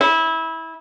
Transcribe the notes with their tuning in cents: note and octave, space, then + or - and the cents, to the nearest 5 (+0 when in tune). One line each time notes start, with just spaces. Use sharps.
E4 -20